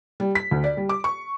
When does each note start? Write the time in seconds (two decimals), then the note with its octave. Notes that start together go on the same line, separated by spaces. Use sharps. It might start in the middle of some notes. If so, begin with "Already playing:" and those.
0.20 G3
0.35 B6
0.51 D2
0.64 D5
0.77 G3
0.89 D6
1.04 C#6